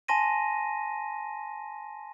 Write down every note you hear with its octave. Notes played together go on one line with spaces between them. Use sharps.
G#5 A5 C6 A#6 D#7